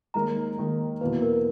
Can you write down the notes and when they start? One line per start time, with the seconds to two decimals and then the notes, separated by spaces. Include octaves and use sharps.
0.14 D#2 D#3 G#3 D#4 A#4 A#5
0.58 D#2 D#3 G#3 D#4 A#4
1.01 E2 B2 A#3 B4
1.22 A#4